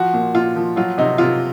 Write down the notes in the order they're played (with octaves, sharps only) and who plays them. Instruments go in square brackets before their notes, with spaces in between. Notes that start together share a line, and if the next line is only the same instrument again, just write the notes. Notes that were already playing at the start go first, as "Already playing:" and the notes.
Already playing: [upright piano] F3 F#4
A#2
A#2 F4
F3
F#3 F4
C3 D#4
C3 F4